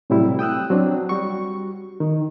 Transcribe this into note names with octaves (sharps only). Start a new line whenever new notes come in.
A2 C3 F#3 G3 C4 E4
G5 D#6 E6 F#6
F#3 C4 D4
G3 F#4 C#6
D#3